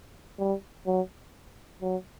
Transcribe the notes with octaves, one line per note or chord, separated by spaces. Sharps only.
G3
F#3
F#3